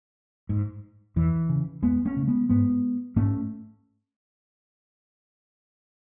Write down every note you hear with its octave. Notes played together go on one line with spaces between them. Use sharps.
G#2
E2 E3
C#3
E2 G#3 B3
A3 C#4
C#3
G#3 B3
G#2 G#3 B3
G#2 A3 C#4